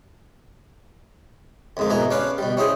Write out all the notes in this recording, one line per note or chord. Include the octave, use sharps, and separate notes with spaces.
F2 G#2 A#3
B2 E4 G#5 A#5
C#4 D4 B4 F5
B2 G3
C#4 E4 G#4 C5